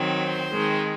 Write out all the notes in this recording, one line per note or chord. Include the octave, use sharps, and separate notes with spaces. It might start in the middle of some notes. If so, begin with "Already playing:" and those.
Already playing: D#3 F#3 C4
C5
D#3 G#3 C4